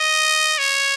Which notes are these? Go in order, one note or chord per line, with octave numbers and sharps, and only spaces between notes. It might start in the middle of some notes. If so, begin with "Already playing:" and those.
Already playing: D#5
C#5